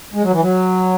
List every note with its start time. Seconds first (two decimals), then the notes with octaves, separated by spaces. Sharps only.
0.14 G#3
0.23 F#3
0.32 E3
0.41 F#3